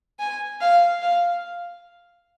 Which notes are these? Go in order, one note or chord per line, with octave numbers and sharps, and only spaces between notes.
G#5
F5
F5